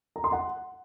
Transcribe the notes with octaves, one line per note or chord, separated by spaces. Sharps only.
A#5
C6
F#5